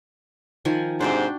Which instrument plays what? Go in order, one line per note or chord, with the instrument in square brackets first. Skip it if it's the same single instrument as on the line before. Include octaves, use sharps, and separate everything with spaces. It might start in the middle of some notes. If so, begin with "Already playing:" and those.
[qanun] D#3 F3 G#5
[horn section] G#2 C3 C5 [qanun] D4 F#4 G5